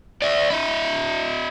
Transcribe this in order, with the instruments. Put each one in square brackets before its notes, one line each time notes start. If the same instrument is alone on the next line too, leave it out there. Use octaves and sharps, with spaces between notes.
[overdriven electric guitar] D5 E5
E4 D#5